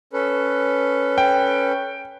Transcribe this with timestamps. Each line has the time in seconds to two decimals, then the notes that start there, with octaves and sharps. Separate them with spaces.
0.13 C#4 A4 B4
1.18 G5